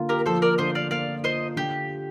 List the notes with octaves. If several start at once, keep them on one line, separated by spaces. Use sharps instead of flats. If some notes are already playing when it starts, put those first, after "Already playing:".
Already playing: D3 A#3 F4
G4 A#4
F3 A4 C5
A#4 D5
D3 C5 D#5
D5 F5
A#3 D5 F5
F4 C5 D#5
D3 G4